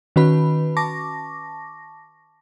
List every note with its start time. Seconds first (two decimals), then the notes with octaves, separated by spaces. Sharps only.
0.16 D#3 C#4 F#4 B4 B5
0.77 A5 C#6 D6 A#6